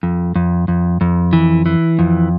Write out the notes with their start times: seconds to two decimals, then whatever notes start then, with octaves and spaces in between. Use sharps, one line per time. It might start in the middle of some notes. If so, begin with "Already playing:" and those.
0.03 F2
0.36 F2
0.68 F2
1.01 F2
1.33 E3
1.66 E3
1.99 F2